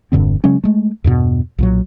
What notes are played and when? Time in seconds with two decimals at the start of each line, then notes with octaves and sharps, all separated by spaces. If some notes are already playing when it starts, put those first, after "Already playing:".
0.12 E1 G2 D3 C4
0.44 C#3 F#3 G#3 C#4
0.64 G#3 A3
1.04 E2 G2 B2
1.58 B1 A#2 F#3